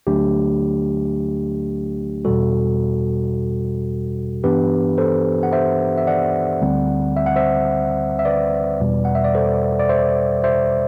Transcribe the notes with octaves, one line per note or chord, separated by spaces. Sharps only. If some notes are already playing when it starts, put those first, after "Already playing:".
D2 D3 F#3 A3 D4 G4
E2 B2 G3 F#4 A4
G2 E3 B3 D4 G4 B4
A4 C5
F#5
C5 E5
E5
D5 F#5
D2 D3 G3 C4
E5
F#5
C5 E5
E5
B4 D5
E2 B2 G3
F#5
E5
D5
A4 C5
D5
C5 E5
C5 E5